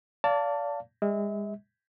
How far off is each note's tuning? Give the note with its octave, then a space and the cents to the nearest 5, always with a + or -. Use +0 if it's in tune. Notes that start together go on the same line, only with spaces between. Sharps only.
D5 -30 F5 +0 A5 +20
G#3 -40 E5 -40